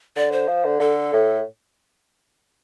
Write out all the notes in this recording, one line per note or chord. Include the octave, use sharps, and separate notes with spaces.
D3 D5
C5
F3
D3
D3 A4
A2